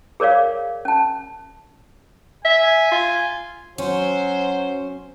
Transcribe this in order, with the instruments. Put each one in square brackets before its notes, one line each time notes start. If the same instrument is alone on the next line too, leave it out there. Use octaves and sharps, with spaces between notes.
[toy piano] G#4 A#4 C#5 D5 F5
C#4 A5
[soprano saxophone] E5 [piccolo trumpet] G#5
[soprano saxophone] F4
[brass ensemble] F#3 C5 [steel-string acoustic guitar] C#4